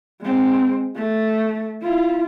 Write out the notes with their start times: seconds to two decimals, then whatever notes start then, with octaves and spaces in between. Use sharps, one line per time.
0.21 G#3 C4
0.96 A3
1.82 E4 F4